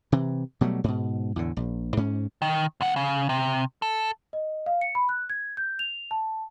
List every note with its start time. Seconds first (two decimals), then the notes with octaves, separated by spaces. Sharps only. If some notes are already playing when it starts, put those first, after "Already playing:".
0.12 C3 E3
0.61 B2 F#3 G3 A3
0.84 G#2 B2
1.36 E2 A2 D3
1.57 A#1
1.97 G#2 C#4
2.42 D#3
2.81 D#2 F#5
2.96 C#3
3.29 C3
3.82 A4
4.33 D#5
4.66 F5
4.81 C#7
4.95 B5
5.09 F#6
5.30 G#6
5.57 G6
5.79 F7
6.11 A5